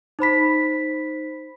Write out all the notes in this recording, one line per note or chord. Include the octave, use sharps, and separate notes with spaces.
D#4 C5 B5 B6